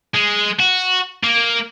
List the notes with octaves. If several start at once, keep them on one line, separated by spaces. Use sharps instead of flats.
G#3
F#4
A#3